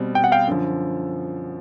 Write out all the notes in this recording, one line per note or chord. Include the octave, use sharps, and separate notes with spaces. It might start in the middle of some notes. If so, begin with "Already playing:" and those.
Already playing: B2 G3 C4
G5
F#5
F5 G5
F#2 D3 F3